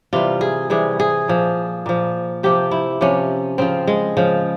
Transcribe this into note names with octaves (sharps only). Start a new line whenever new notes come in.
C3 E3 G3 F4
G#4
C3 E3 G3 G#4
G#4
A#2 F3
A#2 F3
C3 F3 G4
E4
C3 F3 C#4
C#3 F3 C4
G#3
C#3 F3